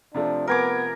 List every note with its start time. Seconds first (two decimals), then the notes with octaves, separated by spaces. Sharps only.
0.14 C3 F3 A3 D4
0.47 B3 A#4 B4 G#5 D6